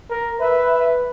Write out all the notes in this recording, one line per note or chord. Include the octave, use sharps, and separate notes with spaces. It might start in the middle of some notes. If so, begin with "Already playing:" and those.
A#4
B4 E5